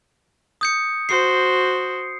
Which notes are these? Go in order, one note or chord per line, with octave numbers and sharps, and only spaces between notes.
D#6 G6 C#7
F#4 C5 C7